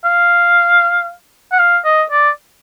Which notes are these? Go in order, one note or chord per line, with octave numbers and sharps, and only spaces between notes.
F5
F#5
F5
D#5
D5